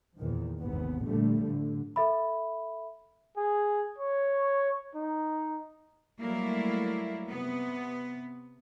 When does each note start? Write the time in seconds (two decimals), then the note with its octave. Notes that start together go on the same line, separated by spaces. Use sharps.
0.17 E2 A#2 D#3 F3
0.59 G#1 D#2 G#2 C3 B3
1.05 A#2 D3 F3 G3 A3
1.42 A2 D3
1.96 A4 E5 B5
3.37 G#4
3.98 C#5
4.95 D#4
6.19 F#3 G3 A3 A#3 E4
7.30 C3 B3